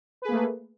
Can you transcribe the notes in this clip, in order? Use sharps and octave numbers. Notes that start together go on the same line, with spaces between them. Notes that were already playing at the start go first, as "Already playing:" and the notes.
A3 A#3 G#4 B4